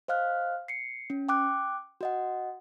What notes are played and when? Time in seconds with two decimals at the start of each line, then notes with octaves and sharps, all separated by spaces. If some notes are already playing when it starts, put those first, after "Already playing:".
0.08 C5 D#5 F5 F6 F#6
0.68 C7 C#7
1.10 C#4
1.29 G5 D6 F#6
2.01 F#4 D#5 F#5